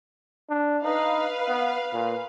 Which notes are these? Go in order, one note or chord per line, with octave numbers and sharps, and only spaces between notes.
D4
D#4 B4 F5
B3
A#2